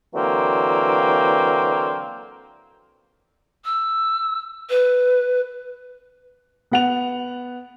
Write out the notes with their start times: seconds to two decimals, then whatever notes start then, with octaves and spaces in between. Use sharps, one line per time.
0.14 D3 E3 F#3 A#3 C4
3.65 E6
4.70 B4
6.71 B3 F#5 F7